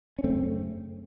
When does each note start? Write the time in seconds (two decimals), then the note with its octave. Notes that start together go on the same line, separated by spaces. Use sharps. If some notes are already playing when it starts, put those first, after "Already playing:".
0.19 C#4
0.24 F#2 C#3 A3 C4